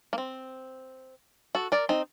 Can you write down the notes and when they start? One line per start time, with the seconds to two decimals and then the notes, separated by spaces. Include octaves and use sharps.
0.13 A#3
0.18 C4
1.55 F#4 A4
1.72 A#4 D5
1.89 C4 D#4